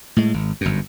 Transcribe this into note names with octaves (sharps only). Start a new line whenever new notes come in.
A2 G#3
G#1
G1 F#2